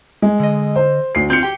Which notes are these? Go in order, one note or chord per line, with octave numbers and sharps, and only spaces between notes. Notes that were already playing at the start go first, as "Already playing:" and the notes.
G#3
D3 D#5
C5
D2 C7
C4 F4 G6 C#7
G4 G5